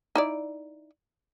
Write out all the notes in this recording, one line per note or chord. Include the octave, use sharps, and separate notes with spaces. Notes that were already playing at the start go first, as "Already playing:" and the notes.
D#4 E4 D5